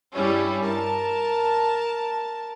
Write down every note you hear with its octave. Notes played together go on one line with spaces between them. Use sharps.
G2 G3 C#4 E4
A#4 A5